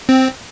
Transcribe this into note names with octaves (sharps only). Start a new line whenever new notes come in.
C4